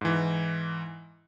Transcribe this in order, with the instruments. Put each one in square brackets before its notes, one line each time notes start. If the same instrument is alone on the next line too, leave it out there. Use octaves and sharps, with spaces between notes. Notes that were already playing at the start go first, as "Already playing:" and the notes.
[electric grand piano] G#2 E3